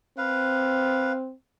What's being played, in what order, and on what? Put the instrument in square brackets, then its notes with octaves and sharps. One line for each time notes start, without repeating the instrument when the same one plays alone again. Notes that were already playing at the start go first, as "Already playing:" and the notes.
[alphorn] C4 [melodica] B4 F5